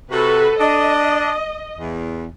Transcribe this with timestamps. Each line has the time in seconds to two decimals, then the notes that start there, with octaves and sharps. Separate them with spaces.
0.11 C3 F#4 A4 B4
0.60 D4 D#5
1.77 E2